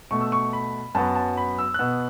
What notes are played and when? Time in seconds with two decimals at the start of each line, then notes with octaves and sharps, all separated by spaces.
0.11 B2 A3 C#6
0.21 E6
0.32 C#6
0.53 B5
0.95 F#2 F#3 B3 A5
1.15 A5
1.37 B5
1.59 E6
1.74 F#6
1.79 B2 B3 E6